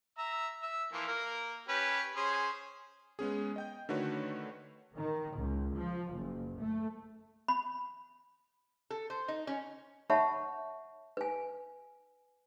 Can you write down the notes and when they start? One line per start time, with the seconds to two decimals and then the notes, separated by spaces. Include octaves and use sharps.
0.18 E5 A#5 E6
0.63 E5 E6
0.93 E3 F3 A#3
1.07 A#3 A#4
1.68 C#4 G4 B4
2.16 C#4 G#4 C5
3.19 G#3 B3 C#4 G#4
3.56 D#5 G5 G6
3.89 D3 D#3 A3 F#4 B4 C#5
4.95 D#3
5.36 C#2
5.76 F3
6.13 F#1
6.57 A3
7.48 B5
8.90 A4
9.10 C5
9.28 D#4
9.47 C#4
10.10 C#5 E5 F#5 A5 B5 C#6
11.17 B4 G#5